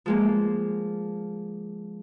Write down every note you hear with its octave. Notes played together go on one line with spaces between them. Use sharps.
F3 G#3 A#3